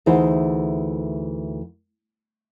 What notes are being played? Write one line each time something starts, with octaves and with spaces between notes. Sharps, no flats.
D2 E3 D#4 G#4 C5